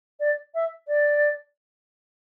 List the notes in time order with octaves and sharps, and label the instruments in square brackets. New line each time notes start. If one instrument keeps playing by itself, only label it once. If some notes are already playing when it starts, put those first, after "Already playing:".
[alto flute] D5
E5
D5